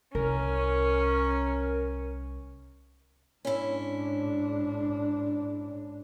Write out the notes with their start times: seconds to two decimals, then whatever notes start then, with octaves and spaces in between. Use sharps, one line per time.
0.15 C2 C#4 A#4
3.45 G#2 C#4 D4 E4